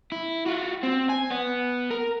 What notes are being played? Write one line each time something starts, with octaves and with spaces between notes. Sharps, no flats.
E4
F4 F#4
C4
G#5
B3
A#4